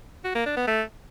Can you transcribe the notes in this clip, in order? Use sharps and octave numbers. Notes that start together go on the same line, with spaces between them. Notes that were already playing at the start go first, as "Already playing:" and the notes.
F#4
A#3
D4
B3
A3